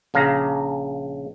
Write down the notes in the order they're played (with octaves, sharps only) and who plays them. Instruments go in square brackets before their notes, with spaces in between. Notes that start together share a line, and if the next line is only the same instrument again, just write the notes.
[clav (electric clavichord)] A#1 C#3 F5 A#5